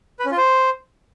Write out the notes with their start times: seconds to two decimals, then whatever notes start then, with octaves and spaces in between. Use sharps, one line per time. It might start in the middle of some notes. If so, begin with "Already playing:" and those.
0.19 B4
0.25 C#4
0.31 F4
0.37 C5